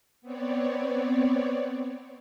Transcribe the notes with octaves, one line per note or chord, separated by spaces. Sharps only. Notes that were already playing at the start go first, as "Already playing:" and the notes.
B3 C4 C#5 D5